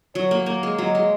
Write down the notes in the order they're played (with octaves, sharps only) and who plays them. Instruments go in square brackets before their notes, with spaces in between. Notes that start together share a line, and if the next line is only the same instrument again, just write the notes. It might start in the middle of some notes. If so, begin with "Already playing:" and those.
[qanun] F#3 [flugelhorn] C#5
[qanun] A#3
A#3
G#3
[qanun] F#3 [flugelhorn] D#5
[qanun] G#3